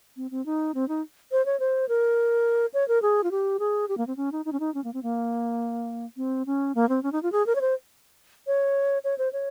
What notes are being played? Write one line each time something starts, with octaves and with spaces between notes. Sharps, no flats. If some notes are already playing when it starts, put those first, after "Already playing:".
C4
C4
D#4
C4
D#4
C5
C#5
C5
A#4
C#5
A#4
G#4
F4
G4
G#4
G4
A#3
C4
C#4
D#4
D#4
C#4
D#4
C#4
A#3
C4
A#3
C4
C#4
A#3
C4
C#4
D#4
F4
G#4
A#4
C#5
C5
C#5
C#5
C5
C#5